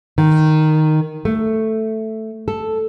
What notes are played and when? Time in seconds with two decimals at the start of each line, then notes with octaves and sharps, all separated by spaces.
0.18 D#3
1.25 A3
2.48 A4